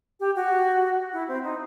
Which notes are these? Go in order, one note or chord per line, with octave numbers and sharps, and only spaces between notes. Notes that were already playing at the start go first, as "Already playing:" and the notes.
G4
F#4
E4
C4
D#4